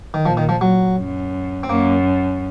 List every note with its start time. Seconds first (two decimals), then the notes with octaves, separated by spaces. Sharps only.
0.14 D#3
0.25 A#2 F3
0.37 D#3
0.49 F3
0.61 F#3
0.97 F#2
1.63 C4
1.69 F#2 A#3